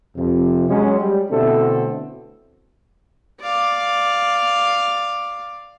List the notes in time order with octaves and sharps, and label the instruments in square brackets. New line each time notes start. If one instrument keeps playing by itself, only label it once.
[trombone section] F2 C3
F#3 G#3 C#4
G3
B2 D3 A3 C4 E4 A4
[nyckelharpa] D5 F5